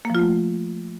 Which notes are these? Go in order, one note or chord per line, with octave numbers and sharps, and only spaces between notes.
F3 A3 A#3 F4